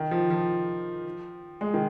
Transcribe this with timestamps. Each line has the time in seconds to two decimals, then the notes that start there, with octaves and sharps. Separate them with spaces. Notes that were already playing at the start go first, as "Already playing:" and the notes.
Already playing: D#3
0.11 F3
0.30 F3
1.61 G#3
1.74 D#3